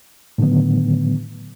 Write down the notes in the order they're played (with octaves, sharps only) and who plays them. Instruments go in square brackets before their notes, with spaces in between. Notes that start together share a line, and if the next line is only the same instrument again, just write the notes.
[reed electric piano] A2 D3 D#3 F#3 B3